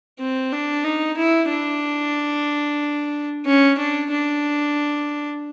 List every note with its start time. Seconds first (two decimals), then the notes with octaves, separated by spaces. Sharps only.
0.19 C4
0.52 D4
0.83 D#4
1.17 E4
1.49 D4
3.45 C#4
3.78 D4
4.10 D4